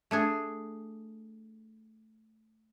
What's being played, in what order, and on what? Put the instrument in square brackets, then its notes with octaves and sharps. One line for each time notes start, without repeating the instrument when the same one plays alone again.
[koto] A3 D4 G#4